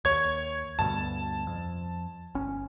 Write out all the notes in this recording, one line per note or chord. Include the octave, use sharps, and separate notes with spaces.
D#2 C#5 G#6
D2 G2 B2 A5
F2
G1 C#4